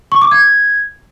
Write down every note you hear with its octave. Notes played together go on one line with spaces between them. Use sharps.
C#6
D6
G#6